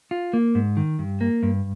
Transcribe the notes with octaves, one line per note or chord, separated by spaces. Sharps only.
F4
A#3
G#2
D#3
G2
A#3
G2